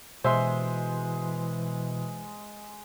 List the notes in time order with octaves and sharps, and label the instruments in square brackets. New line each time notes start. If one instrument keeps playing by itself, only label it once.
[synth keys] B2 [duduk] E3 [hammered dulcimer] G#3 [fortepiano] C5 E5 C6